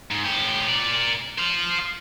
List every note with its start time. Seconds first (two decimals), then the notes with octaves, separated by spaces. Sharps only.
0.11 G#2
0.25 A2 G4
0.68 A#4 D5
1.38 C5 F5